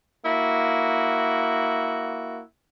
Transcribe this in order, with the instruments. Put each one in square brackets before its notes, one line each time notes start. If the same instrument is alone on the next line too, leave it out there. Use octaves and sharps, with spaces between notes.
[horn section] A#3 E4 F#4